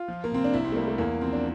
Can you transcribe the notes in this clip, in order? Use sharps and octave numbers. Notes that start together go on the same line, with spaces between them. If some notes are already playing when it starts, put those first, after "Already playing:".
Already playing: F4
F3
A#3
C3 C4
D4
C2 E4
C4
A3
G3 A#3
A3
E2 A#3
F3 C4
D4